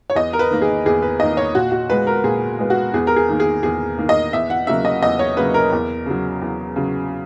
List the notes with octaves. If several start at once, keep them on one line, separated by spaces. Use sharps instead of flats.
C#5
E2 D#5
A#4
B4
D#3 A#3
G#4
E2 G#4
B4
D#3 A#3 D#5
C#5
A#2 F#4
F#4
G#3 B3 B4
A#4
A#2 G#4
G#3 B3
F#4
E2 G#4
A#4
G#4
D#3 A#3
G#4
E2 G#4
D#3 A#3
D#5
E2 E5
F#5
C#3 F#3 A#3 E5
D#5
E2 D#5
C#5
C#3 F#3 A#3 B4
A#4
E2
C#3 F#3
E2
C#3 F#3